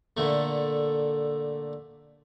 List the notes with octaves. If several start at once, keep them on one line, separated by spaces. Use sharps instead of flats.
A#2 D3 A3